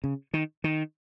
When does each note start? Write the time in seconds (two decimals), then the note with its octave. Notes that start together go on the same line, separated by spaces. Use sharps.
0.04 C#3
0.34 D#3
0.64 D#3